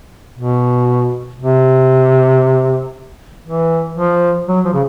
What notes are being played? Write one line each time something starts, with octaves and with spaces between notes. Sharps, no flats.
B2
C3
E3
F3
F#3
F3
C#3